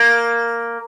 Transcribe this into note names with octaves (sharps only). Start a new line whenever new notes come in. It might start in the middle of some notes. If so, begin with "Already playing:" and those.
Already playing: A#3